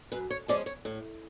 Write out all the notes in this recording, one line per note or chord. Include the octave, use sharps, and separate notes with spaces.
F#2 B4
C#5
F3 G#3 C#4 D5
C#5
A2